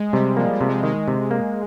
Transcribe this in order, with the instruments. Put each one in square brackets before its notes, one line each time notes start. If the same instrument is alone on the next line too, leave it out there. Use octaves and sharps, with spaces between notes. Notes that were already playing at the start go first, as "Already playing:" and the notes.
Already playing: [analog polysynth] G#3
[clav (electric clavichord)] C3 [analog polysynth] G3
[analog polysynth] F3 [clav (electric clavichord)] A#3
[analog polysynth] G3
[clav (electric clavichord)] C3
[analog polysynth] G#3
[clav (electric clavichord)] D#3 [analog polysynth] G#3
[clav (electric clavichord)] C3
A#3